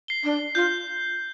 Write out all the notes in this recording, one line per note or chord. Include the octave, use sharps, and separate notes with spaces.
C7 G7
D4
F4 G6